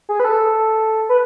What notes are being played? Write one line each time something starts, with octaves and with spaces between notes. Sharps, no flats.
G#4
B4
A4
B4